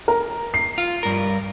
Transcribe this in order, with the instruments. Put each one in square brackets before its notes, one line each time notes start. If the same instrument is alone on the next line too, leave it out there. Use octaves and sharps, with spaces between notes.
[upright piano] A#4
C7
[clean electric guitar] F4
G2 A#4